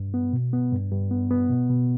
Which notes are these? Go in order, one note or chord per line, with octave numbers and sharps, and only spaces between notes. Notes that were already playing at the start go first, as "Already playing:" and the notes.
Already playing: G2
B3
B2
B3
G2
G2
B3
B3
B2
B2